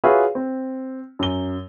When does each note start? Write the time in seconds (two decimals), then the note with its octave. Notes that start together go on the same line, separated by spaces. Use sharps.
0.04 F4 F#4 G#4 B4 C#5 E5
0.35 C4
1.19 F#2 G7